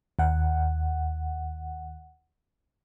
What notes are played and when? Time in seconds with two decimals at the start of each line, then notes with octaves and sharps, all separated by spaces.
0.19 D#2 F#5